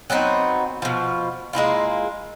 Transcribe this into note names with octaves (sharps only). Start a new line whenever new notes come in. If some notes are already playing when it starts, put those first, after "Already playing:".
F#3 B3 C4 D#4
B2 F3
G#3 A#3 E4 F4